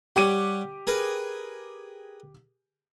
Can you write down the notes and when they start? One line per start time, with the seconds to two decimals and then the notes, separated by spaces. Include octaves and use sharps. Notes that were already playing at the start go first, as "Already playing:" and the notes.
0.16 G3 G4 C#5 F#5 D6 D#7
0.87 G#4 A#4 B4